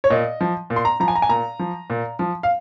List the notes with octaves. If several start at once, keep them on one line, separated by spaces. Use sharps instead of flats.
C#5
A#2 D#5
F3
A#2
C6
A#5
F3 A#5
G#5
A#5
G#5
A#2 A#5
F3
A#2
F3
F5